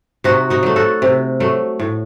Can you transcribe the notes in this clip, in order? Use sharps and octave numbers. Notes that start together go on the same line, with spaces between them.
C3 D#4 F#4
D#4 F#4
F#3 A3
F#4 A4
C3
F#3 A3
A2